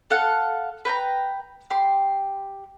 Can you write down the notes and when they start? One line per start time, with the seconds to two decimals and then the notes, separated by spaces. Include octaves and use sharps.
0.10 A4 F5 F#5
0.85 B4 G5 G#5 A#5
1.70 G4 C6